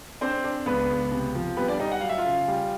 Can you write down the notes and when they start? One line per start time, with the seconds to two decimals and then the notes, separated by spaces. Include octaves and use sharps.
0.21 C4 D4 C5
0.44 D4
0.66 C#2 B3 B4
0.90 C#2
1.12 C3
1.35 F3
1.57 G3 B3 B4
1.68 D4 D5
1.80 G3 D#4 D#5
1.92 F#5
2.01 F#3 F5
2.09 E5
2.18 F4 F5
2.25 C#3
2.48 G3